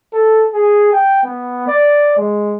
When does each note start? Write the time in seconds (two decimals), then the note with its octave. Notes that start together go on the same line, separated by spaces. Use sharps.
0.13 A4
0.54 G#4
0.93 G5
1.24 B3
1.68 D5
2.17 G#3